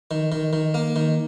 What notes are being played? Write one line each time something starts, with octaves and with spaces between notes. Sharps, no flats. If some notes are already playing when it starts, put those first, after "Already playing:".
D#3
D#3
D#3
A#3
D#3